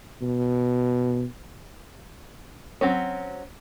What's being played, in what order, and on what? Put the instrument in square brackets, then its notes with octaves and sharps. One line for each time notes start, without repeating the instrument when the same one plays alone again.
[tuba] B2
[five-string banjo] F#3 C4 C#4